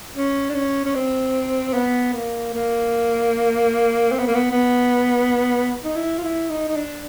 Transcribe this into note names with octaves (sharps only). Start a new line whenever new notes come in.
C#4
D4
C#4
C#4
C4
B3
A#3
A#3
C4
B3
A#3
B3
B3
D#4
E4
F4
E4
D#4
D#4
D4